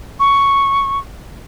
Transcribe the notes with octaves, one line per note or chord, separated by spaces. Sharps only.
C#6